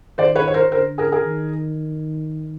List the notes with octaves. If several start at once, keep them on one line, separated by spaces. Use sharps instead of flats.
D#3 C5 D5
B4 C#5
C#5
A#4 C5
D3 A#4 C5
G#4 A#4
G#4 A#4
D#3